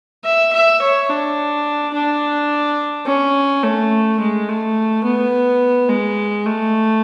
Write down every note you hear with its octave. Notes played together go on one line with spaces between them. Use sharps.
E5
E5
C#5
D4
D4
C#4
A3
G#3
A3
B3
G#3
A3